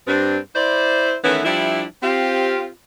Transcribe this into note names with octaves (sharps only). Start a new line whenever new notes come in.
G2 C4 D4
E4 C5 D5
D#3 E3 A3 B3 C#4 E4
F3 G3 D4 E4
C4 F4 G4